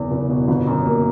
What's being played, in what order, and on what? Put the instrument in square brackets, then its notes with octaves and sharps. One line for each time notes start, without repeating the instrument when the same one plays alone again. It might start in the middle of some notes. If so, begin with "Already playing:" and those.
Already playing: [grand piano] F#1 E2
F#1
B2
G1
F#2
A#3